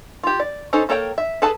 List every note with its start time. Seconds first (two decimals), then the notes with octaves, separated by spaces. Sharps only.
0.23 F4 G4
0.40 D5
0.73 C#4 D#4 A4 C5
0.89 A#3 A4 A#4 C#5 G5
1.18 E5
1.42 G#4 A4 B4 A5